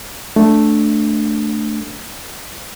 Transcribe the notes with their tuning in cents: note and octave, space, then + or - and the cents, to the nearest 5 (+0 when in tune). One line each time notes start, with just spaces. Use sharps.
A3 +0 D4 +0